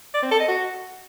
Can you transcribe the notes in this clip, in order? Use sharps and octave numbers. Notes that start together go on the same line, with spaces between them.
D5
C4
A4
D#5
F#4